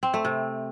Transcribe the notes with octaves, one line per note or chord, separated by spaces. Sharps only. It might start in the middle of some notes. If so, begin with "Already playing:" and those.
C4
A3
C3